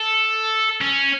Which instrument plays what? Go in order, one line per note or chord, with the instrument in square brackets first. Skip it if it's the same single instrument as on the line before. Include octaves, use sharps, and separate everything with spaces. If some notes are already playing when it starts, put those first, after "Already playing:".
Already playing: [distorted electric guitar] A4
C#4